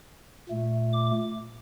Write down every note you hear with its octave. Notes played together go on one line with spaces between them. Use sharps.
A#2 A3
D6